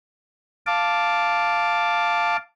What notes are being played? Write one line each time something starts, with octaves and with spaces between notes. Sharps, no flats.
F5 A5 D6